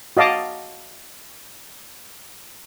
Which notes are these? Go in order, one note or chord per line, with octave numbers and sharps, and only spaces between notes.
F#4 D#5 F5 A5 D6